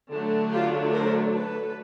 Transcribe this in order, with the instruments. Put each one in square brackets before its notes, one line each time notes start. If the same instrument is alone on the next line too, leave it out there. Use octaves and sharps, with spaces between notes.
[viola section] D3 F#3 A3 D4
F4 G4
A#4 C5
A4 B4